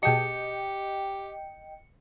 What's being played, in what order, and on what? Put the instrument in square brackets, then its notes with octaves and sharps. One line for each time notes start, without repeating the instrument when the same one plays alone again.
[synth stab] B2 G#4 A5 [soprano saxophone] G4 [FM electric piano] D#5 G5 [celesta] C#7